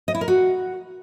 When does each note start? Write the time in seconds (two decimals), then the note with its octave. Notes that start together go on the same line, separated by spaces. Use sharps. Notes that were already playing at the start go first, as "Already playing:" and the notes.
0.08 D#5
0.15 E4
0.21 A#4
0.28 F#4